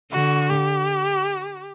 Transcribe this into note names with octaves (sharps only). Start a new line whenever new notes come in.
D3 F#4
G4